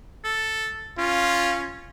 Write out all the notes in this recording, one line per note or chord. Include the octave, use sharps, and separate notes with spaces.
A4
C#4 F4